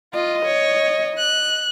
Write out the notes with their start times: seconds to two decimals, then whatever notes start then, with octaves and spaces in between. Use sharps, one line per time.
0.13 F4 D#5
0.45 C#5
1.18 F#6